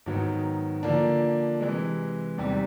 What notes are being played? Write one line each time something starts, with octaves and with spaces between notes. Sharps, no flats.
G#2 D#3 F#3 B3
D3 F3 A#3 D4
C3 E3 G#3
E2 C3 D#3 G3